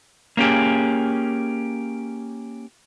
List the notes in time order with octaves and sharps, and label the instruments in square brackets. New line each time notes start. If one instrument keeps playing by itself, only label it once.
[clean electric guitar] A#3 C#4 G4 G#4